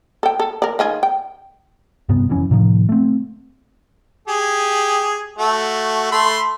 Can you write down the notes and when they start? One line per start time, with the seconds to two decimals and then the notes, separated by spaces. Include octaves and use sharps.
0.23 A4 G5
0.40 A4
0.62 A#4 D5
0.79 D#3 F4 G#4
1.03 G5
2.09 G2 C3 B3
2.29 F1 F#2 E3 C#4
2.51 A2 C3 D#3 F3
2.89 A3 C4
4.28 G4 G#4
5.38 A3 F#4
6.12 A3 B5 C6